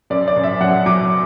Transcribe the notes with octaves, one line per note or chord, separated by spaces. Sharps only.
F#2 D5
D5
F#2
E5
F#2 F#5
F#3 D6